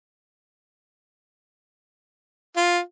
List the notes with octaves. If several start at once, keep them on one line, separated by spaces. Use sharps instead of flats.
F4